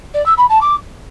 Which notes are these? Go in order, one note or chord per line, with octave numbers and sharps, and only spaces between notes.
D5
E6
B5
A5
D6